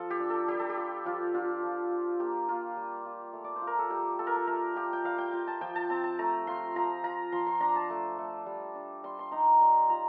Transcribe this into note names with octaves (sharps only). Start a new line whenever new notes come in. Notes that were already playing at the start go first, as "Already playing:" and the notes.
Already playing: F3 F4 A4
G4
D4
A4
G3 G4
A4
G4
F4
F3 F4
D4 F4
F3
F4
A#3 G4
A#3 F4
G3
F4
A3
D5
C5
F4
A#4
A4
G3 G4
F4 A4
A#4
A4
A3 A#4
F4 G4
G5
G3 F5
G5
F4
A5
F3 G5
A5
C4 A5
A5
A3 A#5
F4 C6
F3 A#5
F4 A#5
F3 C6
C6
D4 A#5
A5
A3
A3
G3
D4
G3 C6
C6
D#4 A#5
G3 C6
F4 A#5